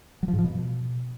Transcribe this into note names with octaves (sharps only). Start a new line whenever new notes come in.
F#3
F3
G#2
F3
B2